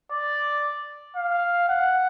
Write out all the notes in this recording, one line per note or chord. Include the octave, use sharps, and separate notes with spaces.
D5
F5
F#5